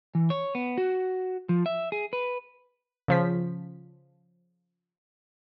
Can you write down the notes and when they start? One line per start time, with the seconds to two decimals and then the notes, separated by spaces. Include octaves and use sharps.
0.15 E3
0.30 C#5
0.55 B3
0.78 F#4
1.49 F3
1.66 E5
1.92 G#4
2.13 B4
3.08 C#3 F3 B6